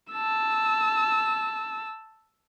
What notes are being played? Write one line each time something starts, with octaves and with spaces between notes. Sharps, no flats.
A5 E6